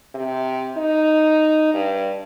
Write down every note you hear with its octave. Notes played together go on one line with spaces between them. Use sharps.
C3
D#4
G2